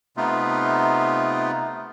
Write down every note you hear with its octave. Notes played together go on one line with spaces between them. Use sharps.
C3 A3 B3 D#4 F4